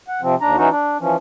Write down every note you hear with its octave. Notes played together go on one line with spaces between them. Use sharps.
F#5
C3 F3 C4
D#2 D4 A#5
E3 C#4 D#4 F#4
D4
E3 F3 C#4